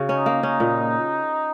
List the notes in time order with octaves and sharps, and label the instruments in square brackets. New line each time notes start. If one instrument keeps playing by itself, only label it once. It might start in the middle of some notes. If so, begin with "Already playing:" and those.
Already playing: [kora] C#3 F#4
[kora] C#4 [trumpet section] D#4
[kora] A#3
C#4
A#2